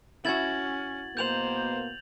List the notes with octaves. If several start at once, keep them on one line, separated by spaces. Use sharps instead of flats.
C#4 E4 F#4 G#6 A6 F#7
B2 A#3 B3 C5 G6 F7 F#7